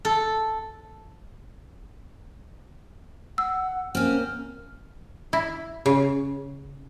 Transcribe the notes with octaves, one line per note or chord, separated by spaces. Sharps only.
A4
F#5 E6
A#3 C4 C#4 F6
E4
C#3